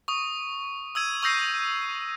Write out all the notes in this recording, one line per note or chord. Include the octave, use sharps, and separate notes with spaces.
C#6 D#6
D#6 E6 G#6 D#7
C#6 D#6 E6 G6 A#6 C7